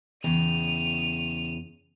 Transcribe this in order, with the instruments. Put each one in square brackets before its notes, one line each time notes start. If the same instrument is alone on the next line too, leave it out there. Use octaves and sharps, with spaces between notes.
[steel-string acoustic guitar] E2 C#3 G5 [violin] D#7 F7